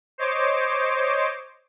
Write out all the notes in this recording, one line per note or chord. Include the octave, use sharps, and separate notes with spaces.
C5 C#5 D#5 D6